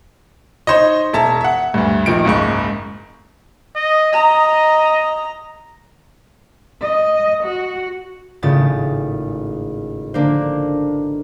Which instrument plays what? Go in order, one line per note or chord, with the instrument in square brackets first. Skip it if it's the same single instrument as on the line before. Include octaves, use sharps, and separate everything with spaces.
[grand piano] D#4 C5 C#5 D#5
E1 E5 A5 A#5
E5 F#5
D2 G2
A#1 D#3 F3 D7
F#1 C#2 G#2 C#6
[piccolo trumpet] D#5
[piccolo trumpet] D#5 [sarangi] A#5
[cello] D#5
F#4
[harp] G#1 A2 C#3 F4 D#6 A6
D3 A#3 D4 A#4 C5